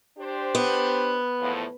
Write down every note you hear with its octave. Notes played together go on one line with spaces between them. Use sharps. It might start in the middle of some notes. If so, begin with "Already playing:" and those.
D4 G4 C5
B3
E2 A2 F3